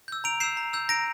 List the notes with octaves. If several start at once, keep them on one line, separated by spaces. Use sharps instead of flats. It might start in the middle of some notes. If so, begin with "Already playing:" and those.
E6 G6
A#5 D7 F7
E6 G6 C7 E7
A#5
E6 G6
A#5 A#6 D7